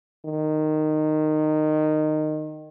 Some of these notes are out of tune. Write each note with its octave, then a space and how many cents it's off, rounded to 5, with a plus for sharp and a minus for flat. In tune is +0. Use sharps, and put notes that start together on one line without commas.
D#3 -15